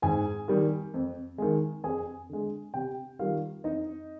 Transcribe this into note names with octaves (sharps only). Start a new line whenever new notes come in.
G#2 G#4 G#5
D#3 G3
F2
D#3 G#3
F2 G#4 G#5
D3 G#3
C3 G4 G5
D#3 G3 F4 F5
F2 D#4 D#5